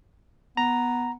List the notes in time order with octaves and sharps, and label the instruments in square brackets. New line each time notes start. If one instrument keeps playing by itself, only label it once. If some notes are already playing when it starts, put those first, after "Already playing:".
[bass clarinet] B3 [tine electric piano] A#5